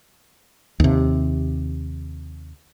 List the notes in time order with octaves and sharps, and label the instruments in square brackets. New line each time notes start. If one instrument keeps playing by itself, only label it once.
[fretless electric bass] D#2 C3